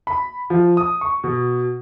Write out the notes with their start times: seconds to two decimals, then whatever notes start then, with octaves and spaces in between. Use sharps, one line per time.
0.07 B5
0.50 F3
0.77 D#6
1.01 C#6
1.24 B2